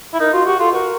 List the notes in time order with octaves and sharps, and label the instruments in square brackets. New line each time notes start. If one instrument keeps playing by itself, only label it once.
[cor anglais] E4
[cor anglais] D#4 [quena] A#4
[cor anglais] F4 [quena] F#4
[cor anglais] F#4 [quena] G4
[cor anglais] F4 [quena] A4
[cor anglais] F#4 [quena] A#4 B4